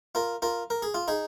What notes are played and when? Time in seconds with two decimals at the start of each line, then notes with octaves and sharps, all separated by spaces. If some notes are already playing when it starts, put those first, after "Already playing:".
0.15 F4 A#4
0.42 F4 A#4
0.70 A#4
0.82 G#4
0.94 F4
1.08 D#4 G#4